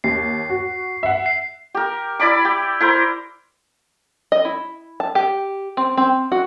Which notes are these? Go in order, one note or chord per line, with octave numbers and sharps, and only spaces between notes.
D#2 C7
F#4
E5 F#5
C7
G4 A#4
E4 D5 B5 D6
G4
E4 A#4 C5
D#5
E4
A5
G4
C4
C4
F#4